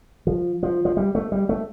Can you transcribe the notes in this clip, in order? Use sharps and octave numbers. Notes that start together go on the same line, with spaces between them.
F3
F3
F3
G3
A3
G3
A3